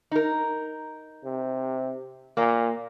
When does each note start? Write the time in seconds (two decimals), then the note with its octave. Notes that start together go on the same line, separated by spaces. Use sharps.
0.11 D#4 A#4
1.25 C3
2.37 A#2 A#3